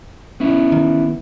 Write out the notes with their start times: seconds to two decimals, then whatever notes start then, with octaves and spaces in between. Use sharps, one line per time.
0.40 B3 C#4 E4
0.72 D#3